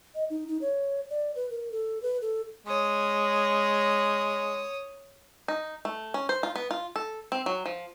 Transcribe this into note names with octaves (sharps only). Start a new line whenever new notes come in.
D#5
D#4
D#4
C#5
D5
B4
A#4
A4
B4
A4
G#3 C#5 D#6
D#4
A3
C#4
C5
F4
B3
F4
A4
C4
F#3
F3